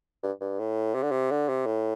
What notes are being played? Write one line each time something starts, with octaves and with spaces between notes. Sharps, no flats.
G2
G2
A2
C3
D3
C3
D3
C3
A2